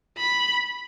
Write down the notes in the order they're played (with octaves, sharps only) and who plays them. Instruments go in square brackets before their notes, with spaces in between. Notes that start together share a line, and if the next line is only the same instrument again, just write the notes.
[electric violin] B5